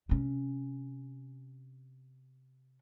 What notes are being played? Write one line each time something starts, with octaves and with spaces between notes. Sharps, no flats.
C3 C#4